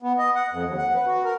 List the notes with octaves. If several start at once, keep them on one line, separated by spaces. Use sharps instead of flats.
B3
D#5
F#5
F2
D#2
F#5
B4
F#4
A#4